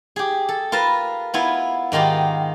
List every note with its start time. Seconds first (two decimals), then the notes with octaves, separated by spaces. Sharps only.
0.16 G4 G#4
0.49 A4
0.72 F4 A#4 B4 A5
1.34 B3 E4 F4 G#5
1.92 G#2 D#3 D#4 F4 G4